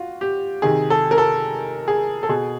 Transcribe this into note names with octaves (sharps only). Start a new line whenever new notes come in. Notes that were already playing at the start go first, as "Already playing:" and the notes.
Already playing: F4 F#4
G4
C3 D#3 G#4
A4
A#4
A4
G#4
A4
B2 G#4